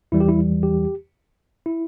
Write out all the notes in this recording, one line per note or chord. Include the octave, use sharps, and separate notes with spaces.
E2 E3 G3 E4
G4
E4
G4
E4